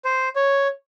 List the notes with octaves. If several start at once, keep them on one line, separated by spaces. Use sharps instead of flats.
C5
C#5